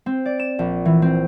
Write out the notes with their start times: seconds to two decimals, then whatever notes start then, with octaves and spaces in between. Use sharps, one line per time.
0.06 C4
0.25 D5
0.40 E7
0.59 A#1
0.85 E3
1.02 C4